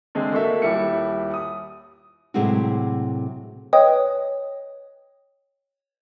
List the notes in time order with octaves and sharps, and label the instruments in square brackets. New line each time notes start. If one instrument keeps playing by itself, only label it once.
[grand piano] D3 G#3 A3 C4
A3 A#3 F#4 A4 E5
D#1 G3 E4 C#7
D#6
[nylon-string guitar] A2 C3 F#3 G#3 E4 F#4
[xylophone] B4 C#5 D#5 G5 D#6